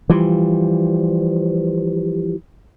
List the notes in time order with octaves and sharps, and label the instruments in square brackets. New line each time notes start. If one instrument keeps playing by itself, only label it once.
[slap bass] E3 F3 G3